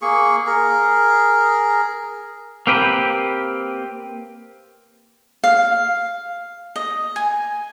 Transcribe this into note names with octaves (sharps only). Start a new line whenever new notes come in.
A#3 G#4 C#6
G#4 A#4
A#3 C4 G4 B4
F5
D#5
G#5